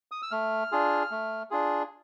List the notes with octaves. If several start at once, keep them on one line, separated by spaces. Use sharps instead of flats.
D#6
E6
A3 F6
D4 F4 G#4
A3
D4 F4 G#4